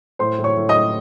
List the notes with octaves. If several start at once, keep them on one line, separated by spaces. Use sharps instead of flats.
A2 C5 C6
A2
C#5 C#6
A2
D#5 D#6
A2